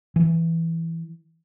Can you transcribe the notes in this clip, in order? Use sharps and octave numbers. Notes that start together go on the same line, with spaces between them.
E3